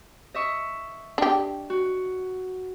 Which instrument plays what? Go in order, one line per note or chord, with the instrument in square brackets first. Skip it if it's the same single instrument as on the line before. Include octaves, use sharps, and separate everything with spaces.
[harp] D#5 E5 C#6
[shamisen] D4 G4
[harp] F#4